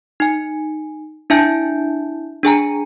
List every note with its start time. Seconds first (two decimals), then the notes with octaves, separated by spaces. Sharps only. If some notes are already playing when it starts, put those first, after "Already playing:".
0.20 D#4 G#5
1.30 D4 E4 E5 G#5 A5 G6
2.43 D4 G#4 G#5 A#5